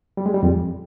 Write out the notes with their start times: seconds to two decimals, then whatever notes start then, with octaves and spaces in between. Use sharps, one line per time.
0.17 G3
0.26 G#3
0.34 G3
0.43 F2